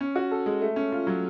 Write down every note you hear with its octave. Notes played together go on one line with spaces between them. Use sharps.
C#4
F#4
A4
G#3
A3
C#4
F4
F#3